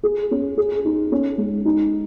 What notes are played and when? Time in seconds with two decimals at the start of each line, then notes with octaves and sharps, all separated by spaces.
0.03 G#4
0.31 C#4
0.57 G#4
0.85 D#4
1.12 C#4
1.38 G#3
1.65 D#4